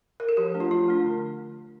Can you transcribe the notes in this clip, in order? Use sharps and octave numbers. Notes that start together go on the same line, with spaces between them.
A#4
A4
F3 G4
A3 D4
F4
F3 F4
A3 D4
D3